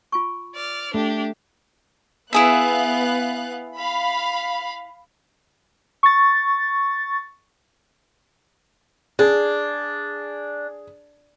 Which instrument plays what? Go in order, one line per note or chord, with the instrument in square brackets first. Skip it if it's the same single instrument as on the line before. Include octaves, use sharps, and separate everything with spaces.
[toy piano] F4 G#5 C#6
[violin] D5 F6
[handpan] A3 [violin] D4 G4
[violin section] B3 F5 F#6 [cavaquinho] E4 G#4 E5
[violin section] F5 B5
[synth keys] C#6 A6
[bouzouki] D4 [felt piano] G#4